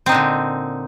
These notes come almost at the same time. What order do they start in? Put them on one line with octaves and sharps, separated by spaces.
C4 D#4 A#2 D3